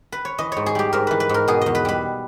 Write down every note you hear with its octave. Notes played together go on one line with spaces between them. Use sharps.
B4
C#5
E3 D#5
G#2 C#5
G#4
G3 G4
G#2 A#4
E3 B4
B4
G#2 A#4
B2 G#4
E2 D#5
B4
G3 B4